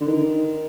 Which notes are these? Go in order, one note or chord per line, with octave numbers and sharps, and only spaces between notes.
D3
D#3